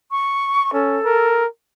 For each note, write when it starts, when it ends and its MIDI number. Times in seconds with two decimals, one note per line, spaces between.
0.11 0.71 85
0.73 0.99 61
0.73 1.42 69
1.05 1.46 70